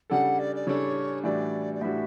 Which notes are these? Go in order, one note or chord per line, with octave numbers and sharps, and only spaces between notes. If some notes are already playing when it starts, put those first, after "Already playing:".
C#3 G3 D4 A4 F#5
D5
D5
C#3 G3 D4 A4 C#5
A2 E3 G3 D4 F#4 D5
D5
A2 E3 G3 D4 F#4 E5